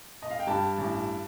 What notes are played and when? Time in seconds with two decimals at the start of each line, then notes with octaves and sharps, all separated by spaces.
0.22 D#5
0.30 F5
0.39 G5
0.47 G2 A5
0.78 A1